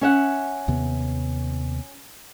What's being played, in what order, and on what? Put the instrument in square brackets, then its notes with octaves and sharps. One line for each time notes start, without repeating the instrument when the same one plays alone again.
[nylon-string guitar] C#4 E5 F#5
[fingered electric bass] D#2 C3 B3